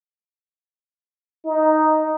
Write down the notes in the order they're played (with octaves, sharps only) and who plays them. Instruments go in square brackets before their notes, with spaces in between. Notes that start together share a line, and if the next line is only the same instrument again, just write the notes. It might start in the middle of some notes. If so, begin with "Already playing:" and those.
[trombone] D#4